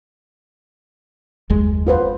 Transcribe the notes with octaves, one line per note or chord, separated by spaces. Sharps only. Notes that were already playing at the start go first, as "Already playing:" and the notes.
F#1 D#2 G#3
F4 B4 C5